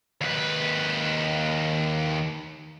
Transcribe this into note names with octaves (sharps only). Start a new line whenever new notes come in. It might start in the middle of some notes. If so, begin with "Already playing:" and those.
D#2 B4